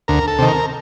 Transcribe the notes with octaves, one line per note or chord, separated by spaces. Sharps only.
D2 A#4
A4
C3 D#3
A#4